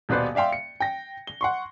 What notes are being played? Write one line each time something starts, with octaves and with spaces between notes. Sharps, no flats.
D#1 B2 B3 B4 C5 D5
D5 E5 F5 G5 C6
C#7
G5 A#6
G7
F#5 C6 C#6